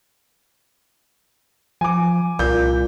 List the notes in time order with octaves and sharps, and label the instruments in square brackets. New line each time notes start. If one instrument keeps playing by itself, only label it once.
[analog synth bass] F3 [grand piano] G#5 D6
[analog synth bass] C2 [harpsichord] A#2 [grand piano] G6